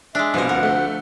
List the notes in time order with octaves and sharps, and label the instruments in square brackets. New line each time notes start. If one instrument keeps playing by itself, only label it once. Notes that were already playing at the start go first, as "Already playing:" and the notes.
[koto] G#3 D4 [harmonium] E5
[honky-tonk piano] C2 B2 [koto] F3 A#4
[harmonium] D2 F#5 [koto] A#4
[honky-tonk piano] A3